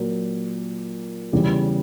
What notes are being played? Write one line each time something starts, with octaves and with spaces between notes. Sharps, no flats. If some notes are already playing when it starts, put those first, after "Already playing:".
Already playing: A#2 F#3 A#3
E2 C#3 E3 G3